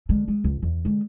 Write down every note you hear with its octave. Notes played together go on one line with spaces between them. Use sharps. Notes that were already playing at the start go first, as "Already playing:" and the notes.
D3 G#3
G#3
C#2
E2
D3 G#3